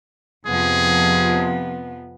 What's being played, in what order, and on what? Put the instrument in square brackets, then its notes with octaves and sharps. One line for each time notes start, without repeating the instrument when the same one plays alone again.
[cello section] F2 C3 F3 [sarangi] B3 [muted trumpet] G#4